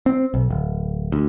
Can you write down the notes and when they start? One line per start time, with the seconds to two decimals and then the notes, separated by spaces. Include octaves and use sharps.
0.06 C4
0.34 B1
0.51 D1
1.12 D2